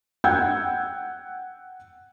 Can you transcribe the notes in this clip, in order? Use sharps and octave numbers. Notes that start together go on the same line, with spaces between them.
F#5 G5 E6 G6 G#6